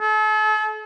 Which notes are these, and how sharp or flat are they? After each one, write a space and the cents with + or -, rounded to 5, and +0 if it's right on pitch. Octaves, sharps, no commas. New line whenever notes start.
A4 -40